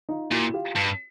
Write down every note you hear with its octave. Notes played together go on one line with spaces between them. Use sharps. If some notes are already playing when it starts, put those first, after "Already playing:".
D#4 F4
A#2 E4 F#4
F4 G4
G2